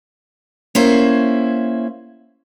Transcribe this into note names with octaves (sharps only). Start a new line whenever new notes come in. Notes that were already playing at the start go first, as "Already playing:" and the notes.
A#3 C#4 E4 C5